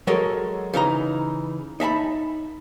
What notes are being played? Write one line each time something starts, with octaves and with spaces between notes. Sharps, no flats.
F#3 G#3 A4 A#4 C#5
C#3 E3 D#4 A#5
D#4 E5 A5 B5